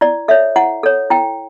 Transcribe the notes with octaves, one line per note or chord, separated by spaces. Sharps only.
E4 D5
A4 C#5 E5
E4 F#5
A4 C#5
E4 G5